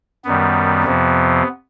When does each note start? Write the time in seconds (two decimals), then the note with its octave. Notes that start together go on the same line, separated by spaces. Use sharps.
0.25 F#2 D#3 G3 B3
0.84 F2 C3 F3